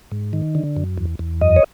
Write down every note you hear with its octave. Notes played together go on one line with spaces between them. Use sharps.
G#2
D#3
D3
F#2
E2
E2
F#2 D#5
C#5